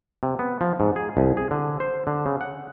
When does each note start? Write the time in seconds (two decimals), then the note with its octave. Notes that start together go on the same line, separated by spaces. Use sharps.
0.23 C3
0.39 B3
0.61 F3
0.80 G#2
0.96 G#4
1.17 C2
1.37 G#4
1.51 D3
1.80 C5
2.07 D3
2.26 C#3
2.41 F#5